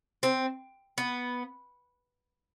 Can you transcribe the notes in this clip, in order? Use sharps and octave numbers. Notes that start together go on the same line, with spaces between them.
C4
B3